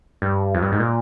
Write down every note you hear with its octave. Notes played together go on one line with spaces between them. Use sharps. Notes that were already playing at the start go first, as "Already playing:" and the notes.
G2
F2
G2
G#2
A#2